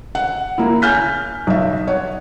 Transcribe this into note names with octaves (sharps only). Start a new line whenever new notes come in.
F#5
A#3 E4
G#5 F6 G6 B6
B1 E5
C#5 F#5